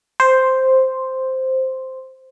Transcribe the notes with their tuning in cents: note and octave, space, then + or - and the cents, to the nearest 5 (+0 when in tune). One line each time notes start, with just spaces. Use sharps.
C5 +0